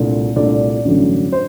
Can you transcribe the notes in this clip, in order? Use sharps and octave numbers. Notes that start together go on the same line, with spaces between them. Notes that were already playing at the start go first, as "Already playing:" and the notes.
Already playing: C2 A#2 A3 D4
C2 A#2 A3 D4 D5
A1 G2 D3 F#3 A3
C5